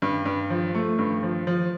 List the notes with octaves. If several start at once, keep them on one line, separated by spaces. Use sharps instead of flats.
G2
G2
F3
A3
G2
F3
F3